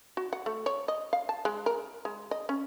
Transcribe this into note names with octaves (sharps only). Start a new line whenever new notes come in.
F#4
F#5
A3
C#5
D#5
F5
A5
G#3
A#4
G#3
D#5
C#4